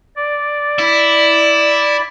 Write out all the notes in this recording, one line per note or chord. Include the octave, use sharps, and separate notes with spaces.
D5
E4